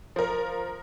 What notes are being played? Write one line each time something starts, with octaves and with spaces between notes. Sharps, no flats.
F3 A#4